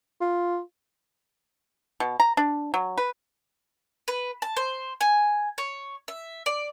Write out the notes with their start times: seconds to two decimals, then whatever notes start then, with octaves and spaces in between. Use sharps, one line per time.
0.21 F4
2.00 B2
2.20 A#5
2.37 D4
2.74 F#3
2.98 B4
4.08 B4
4.42 A5
4.57 C5
5.01 G#5
5.58 C#5
6.08 E5
6.46 D5